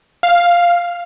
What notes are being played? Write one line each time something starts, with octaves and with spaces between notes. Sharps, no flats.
F5